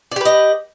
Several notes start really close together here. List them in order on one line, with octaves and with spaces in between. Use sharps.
D5 G4 B4 D#5